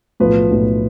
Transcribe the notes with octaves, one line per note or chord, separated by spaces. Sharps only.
B1 A2 F3 B4
B1 A2 F3